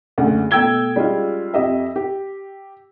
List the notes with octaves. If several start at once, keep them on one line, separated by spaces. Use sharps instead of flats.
F#1 D2 C#3 F#5
B2 A3 G5 E6 G#6 G7
G3 G#3 C#4 D#4 F4
F2 G4 D#5 E5
G4